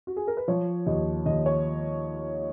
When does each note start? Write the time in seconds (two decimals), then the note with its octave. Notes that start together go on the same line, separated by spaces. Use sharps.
0.07 F#4
0.17 G#4
0.27 A#4
0.37 B4
0.48 F3 C#5
0.86 D#2 D#5
1.25 D#2 D#5
1.46 C#5